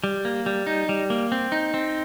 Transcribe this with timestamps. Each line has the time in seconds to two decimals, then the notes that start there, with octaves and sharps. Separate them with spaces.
0.04 G3
0.25 A#3
0.46 G3
0.67 D#4
0.89 G3
1.10 A#3
1.32 C4
1.52 D#4
1.74 C4